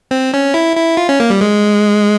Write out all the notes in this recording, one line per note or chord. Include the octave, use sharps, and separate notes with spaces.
C4
C#4
E4
E4
F4
C#4
A#3
G3
G#3